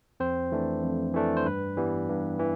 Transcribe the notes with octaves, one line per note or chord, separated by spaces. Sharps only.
F2 C4 C5
E3 A3 D4
F2
E3 A3 D4
C5
G2 B4
E3 G3 B3
G2
E3